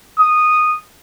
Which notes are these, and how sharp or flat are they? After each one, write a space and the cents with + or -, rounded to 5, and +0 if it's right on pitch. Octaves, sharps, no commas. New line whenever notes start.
D#6 -10